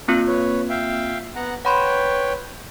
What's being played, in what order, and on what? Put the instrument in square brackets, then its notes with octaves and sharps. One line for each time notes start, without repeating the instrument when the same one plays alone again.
[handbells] A#3 C4 F4
[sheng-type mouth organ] B4 C#5
E5 F5 G5
B3 F#5 A#5
[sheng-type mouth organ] B4 C#5 G5 [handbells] F#5 B5 C6